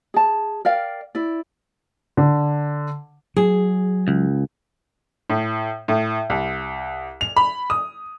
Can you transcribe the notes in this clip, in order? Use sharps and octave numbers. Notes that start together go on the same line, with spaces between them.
G#4 A5
A#4 D5 F5 G5
E4 D5
D3
F#3 G#4
C#2
A2
A2
C2
F7
B5
D#6